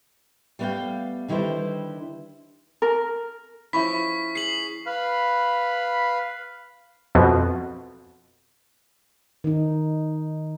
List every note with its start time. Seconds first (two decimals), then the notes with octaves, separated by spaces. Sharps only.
0.59 G3 A3 B3 C#5 F5 G5
1.28 D3 D#3 G3 E4 B4 C5
2.82 A#4
3.73 F3 C#4 E4 E5 B5 C#6 B6
4.35 G#4 C7 F#7
4.86 B4 F5 B5
7.15 F2 B2
9.44 D#3 D#4